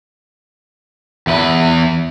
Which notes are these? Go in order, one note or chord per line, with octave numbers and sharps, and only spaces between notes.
E2 B4